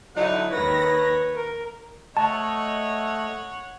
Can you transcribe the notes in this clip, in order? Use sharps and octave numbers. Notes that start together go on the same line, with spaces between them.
D3 F#3 D#4 E4 F#5
D#2 D#3 B4 C#5 A#6
A#4
A3 C#5 D#5 F#5 A5